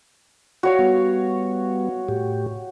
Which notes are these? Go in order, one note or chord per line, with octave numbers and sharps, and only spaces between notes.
F#4 C#5 F5
G3 B3
A2 G4